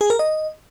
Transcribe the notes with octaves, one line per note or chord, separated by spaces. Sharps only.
G#4
A#4
D#5